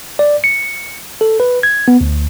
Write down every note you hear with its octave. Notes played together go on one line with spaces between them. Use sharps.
D5
C#7
A4
B4
G#6
B3
D2